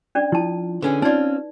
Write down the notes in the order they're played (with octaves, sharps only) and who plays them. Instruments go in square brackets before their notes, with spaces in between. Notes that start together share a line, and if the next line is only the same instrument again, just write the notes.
[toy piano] C#4 D4 D5
[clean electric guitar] F3 [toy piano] E4 A5
[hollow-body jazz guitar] D3 C#4 G#4 [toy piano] B4
[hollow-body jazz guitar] C4 F4 [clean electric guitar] C#4 [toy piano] D#4 D5